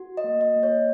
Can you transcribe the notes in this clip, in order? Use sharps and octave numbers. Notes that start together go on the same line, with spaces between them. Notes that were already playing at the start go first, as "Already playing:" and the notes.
Already playing: F#4
D#5
A#3
D#5
A#3
C#5